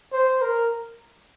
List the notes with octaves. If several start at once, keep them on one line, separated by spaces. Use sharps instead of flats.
C5
A#4